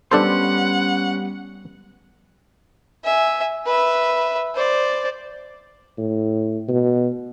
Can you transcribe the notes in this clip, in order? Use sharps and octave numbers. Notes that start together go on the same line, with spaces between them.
G3 B3 C#4 D4 A4 C5 F#5 C6
E5 G#5
B4 E5
C5 D5
A2
B2